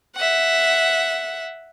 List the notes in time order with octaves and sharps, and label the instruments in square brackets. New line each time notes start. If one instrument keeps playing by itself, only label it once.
[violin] E5 F#5